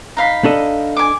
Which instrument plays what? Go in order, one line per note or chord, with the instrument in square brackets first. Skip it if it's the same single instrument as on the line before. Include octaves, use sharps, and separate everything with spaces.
[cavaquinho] D#4 F5 B5
[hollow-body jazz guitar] D4 A4 D#5
[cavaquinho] G#5 D6